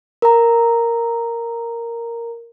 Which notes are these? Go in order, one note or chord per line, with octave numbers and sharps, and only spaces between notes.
A#4 A#5